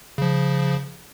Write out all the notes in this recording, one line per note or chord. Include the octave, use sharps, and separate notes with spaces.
C#3 F3